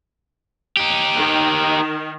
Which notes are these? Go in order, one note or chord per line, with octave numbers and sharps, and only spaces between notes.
D#4 G4
D#3